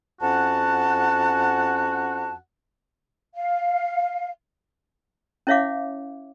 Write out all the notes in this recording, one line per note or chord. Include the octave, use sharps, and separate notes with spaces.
F2 C#4 F#4 F#5 A5
F5
C#4 E4 C#5 E5 F5 D6